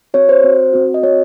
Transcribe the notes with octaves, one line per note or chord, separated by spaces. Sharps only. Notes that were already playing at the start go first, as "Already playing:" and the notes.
C4 F#4 C#5
C5
C4 F#4
C4 F#4
D#5
C4 F#4 C#5